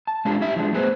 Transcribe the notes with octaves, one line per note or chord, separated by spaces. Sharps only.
A5
G#3 C#4 D4 F4 G4 A4
C#4 E4 G4 E5
F3 G#3 D4
A3 B3 F#4 G#4 B4 C5